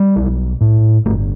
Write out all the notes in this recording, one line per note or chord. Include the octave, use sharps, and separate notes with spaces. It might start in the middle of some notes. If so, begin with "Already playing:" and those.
Already playing: G3
B1
A2
G1 A3